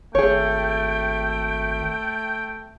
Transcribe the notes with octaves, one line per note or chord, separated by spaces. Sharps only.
G#1 A3 G#4 C#5 G5